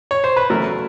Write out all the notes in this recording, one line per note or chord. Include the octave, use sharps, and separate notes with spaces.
C#5
C5
B4
E2 C#3 F#3 A3 A#4